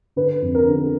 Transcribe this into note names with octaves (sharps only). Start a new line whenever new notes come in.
D3 B4
F2
A#4
D3